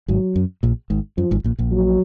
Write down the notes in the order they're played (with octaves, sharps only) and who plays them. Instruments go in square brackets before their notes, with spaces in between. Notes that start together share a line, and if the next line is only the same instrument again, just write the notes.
[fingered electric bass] G#1 G#2 [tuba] F#3
[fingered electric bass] F#2
A#1 A#2
G#1 G#2
[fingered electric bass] F#2 [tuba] F3
[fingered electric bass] G#1 G#2
A#1 A#2
A#1 A#2
[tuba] F#3